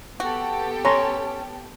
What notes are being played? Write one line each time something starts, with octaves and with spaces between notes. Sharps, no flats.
B3 F#4 G4 A4
C#4 C#5 A#5 C6